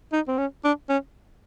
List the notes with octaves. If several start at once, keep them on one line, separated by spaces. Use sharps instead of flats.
D#4
C4
C#4
D4
C#4